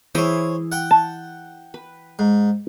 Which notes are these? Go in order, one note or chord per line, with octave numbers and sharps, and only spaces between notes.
E3 E4 G#4 C5 C#5
F#5 G5
A5
B4
G#2